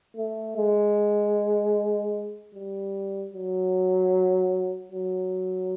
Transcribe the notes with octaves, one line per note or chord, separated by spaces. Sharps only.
A3
G#3
G3
F#3
F#3